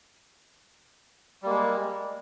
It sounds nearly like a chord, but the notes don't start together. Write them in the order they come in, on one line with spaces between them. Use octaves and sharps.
G3 A#3 G#3